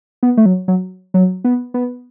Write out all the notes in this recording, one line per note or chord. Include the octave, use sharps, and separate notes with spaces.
B3
A3
F#3
F#3
F#3
B3
B3